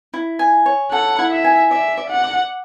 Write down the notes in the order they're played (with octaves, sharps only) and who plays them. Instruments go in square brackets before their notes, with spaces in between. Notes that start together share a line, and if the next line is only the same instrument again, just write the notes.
[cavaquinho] E4
G#5
C#5
[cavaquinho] A4 [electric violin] F#5
[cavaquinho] E4
[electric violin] E5
[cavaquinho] G#5
[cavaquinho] D5 [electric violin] E5
[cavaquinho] D5
[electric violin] F#5
[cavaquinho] D6